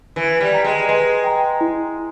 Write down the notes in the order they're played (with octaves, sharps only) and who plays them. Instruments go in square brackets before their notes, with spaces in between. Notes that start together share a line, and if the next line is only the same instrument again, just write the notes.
[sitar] E3 [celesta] B4
[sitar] G3
[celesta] G5 A#5
[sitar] G#3
[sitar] G#3 [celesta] B4
[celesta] G5 A#5
E4